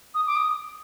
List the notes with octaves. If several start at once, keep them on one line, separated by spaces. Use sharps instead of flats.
D#6
D6
D#6